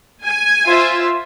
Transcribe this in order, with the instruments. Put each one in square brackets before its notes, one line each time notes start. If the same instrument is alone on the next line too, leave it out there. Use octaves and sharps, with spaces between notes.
[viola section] G#5
[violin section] F4 C5 E5